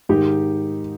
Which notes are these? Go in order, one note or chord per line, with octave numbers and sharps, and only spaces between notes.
G#2 D#3 D#4 G4